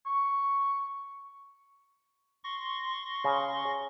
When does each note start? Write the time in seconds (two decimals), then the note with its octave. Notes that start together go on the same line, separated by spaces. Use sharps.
0.06 C#6
2.44 C6 C#6 A#6
3.24 C#3